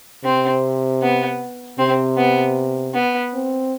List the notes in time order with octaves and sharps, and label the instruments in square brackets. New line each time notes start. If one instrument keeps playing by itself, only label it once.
[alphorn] C3 [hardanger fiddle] C4
[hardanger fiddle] B3
[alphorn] C3 [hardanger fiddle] C4
[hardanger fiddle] B3
B3
[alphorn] C4